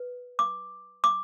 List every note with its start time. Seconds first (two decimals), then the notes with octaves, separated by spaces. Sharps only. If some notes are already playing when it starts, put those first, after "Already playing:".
Already playing: B4
0.39 D6
1.04 D6